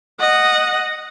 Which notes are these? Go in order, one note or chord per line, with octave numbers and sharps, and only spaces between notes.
D#5 F#5